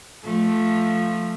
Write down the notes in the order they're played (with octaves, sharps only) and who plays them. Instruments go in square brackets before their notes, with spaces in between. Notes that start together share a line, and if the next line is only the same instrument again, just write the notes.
[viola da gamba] F3 A3